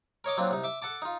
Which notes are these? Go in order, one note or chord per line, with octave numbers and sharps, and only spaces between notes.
A#4 C#5 D#5 D6
F#3 A#3 C4 D4 F4
C2 D#4
E5 D6
A4 F#5 A5 D6
D#4 F4